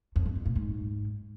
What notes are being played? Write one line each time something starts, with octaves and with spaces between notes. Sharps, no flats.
F2
G2
E2
A#2
G#2